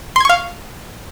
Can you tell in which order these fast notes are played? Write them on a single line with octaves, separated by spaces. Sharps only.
C6 G#6 C#6 F5